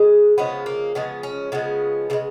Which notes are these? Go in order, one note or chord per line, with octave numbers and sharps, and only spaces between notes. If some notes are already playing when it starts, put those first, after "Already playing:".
Already playing: C#3 G#3 G#4
C#3 F3 G#3 B3
A#3
C#3 F3 G#3 B3
C#4
C#3 F3 G#3 B3
C#3 F3 G#3